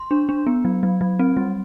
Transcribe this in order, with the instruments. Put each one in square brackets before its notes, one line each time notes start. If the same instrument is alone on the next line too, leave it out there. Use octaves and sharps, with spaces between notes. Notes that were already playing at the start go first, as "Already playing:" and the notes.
Already playing: [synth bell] C6
D4
D4
B3
F#3
F#3
F#3
C4
G3